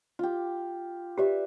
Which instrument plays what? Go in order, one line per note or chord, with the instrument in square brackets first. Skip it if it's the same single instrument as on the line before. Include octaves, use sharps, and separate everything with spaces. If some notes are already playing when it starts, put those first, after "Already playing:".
[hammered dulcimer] F4 G4
[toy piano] G4 [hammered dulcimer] B4 D5 E5